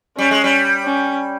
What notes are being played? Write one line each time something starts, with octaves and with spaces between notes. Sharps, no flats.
G3 C#4
G#3
G3
C#4